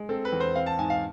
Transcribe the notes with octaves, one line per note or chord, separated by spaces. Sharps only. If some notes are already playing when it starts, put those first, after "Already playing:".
Already playing: G#3
C4 A4
B4
E2
C5
C4 F5
A5
G#2 G#5
F5